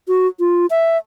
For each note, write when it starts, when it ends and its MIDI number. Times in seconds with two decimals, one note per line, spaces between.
0.08 0.27 66
0.40 0.66 65
0.70 0.97 76